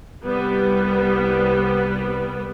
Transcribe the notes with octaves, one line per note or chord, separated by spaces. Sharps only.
C2 G3 B3